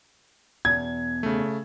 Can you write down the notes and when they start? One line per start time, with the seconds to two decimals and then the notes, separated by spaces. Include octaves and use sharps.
0.65 E2 B2 G#6
1.23 C#3 A3